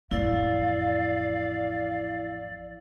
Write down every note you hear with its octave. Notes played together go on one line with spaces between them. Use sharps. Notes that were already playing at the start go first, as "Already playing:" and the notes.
A1 F2 E4 D5 F5 E6